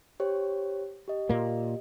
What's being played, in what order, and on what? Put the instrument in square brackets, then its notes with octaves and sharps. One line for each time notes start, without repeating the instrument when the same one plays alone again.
[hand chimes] G4 C5 C#5
G4 D#5
[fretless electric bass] A#2 A#3